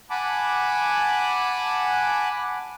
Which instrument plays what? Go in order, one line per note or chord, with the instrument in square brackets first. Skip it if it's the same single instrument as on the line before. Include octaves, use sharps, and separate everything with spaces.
[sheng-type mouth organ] F#5 G#5 A5 B5 D6